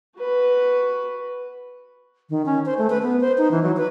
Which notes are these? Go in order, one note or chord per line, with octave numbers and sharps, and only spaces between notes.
F#4 B4
D#3
C#4
C5
A3
B4
B3
C5
D#4
E3
F#3
B4